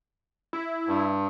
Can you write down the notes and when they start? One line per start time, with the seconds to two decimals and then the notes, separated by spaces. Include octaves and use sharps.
0.53 E4
0.87 G2